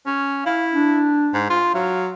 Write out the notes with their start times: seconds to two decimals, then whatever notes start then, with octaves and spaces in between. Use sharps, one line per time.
0.06 C#4
0.46 E4 F5
0.73 D4
1.34 G#2
1.50 F4
1.74 F#3 F5